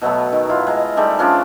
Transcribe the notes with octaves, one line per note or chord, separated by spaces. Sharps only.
B2 F#3 A3 B3
D#3
E4 F4
G#3 A#5
D#3 G3 A3 G#4
F3 C#4 D4 F4